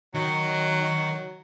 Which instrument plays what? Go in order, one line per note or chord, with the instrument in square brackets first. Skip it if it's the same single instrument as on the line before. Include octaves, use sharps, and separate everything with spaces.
[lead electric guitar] D#3 [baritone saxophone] F#3